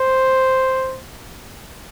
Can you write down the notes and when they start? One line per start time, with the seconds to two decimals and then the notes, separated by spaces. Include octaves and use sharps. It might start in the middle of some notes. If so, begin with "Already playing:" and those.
Already playing: C5